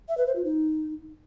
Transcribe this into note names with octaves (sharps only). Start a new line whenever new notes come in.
E5
B4
C5
F4
D#4